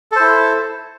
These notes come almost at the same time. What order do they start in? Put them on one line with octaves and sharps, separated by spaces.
A4 C5 E4